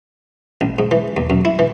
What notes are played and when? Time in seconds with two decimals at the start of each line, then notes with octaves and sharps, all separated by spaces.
0.61 A1
0.79 G#2
0.91 E3
1.17 D#2
1.30 F#2
1.45 E4
1.59 E3